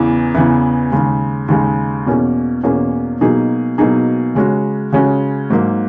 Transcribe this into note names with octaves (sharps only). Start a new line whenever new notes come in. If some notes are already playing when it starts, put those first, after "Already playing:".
Already playing: E2 C#3 E3 B3 E4
E2 C#3 E3 B3 E4
D#2 C#3 G#3
D#2 C#3 G#3
E2 B2 A#3 C#4 G#4
E2 B2 A#3 C#4 G#4
B2 F#3 A#3 D#4 G#4
B2 F#3 A#3 D#4 G#4
C#3 G#3 C#4 F#4
C#3 G#3 C#4 F#4
G#2 F#3 A#3